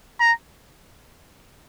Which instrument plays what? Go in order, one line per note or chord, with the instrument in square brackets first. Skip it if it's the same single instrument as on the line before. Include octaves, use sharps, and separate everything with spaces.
[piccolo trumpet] A#5